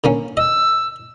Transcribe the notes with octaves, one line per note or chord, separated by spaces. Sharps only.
D3 A#3 C#4
D#5 E6